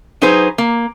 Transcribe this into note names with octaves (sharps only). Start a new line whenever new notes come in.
F#3 D#4 G#4 B4 C5
A#3